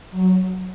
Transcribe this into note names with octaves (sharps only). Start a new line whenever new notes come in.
F#3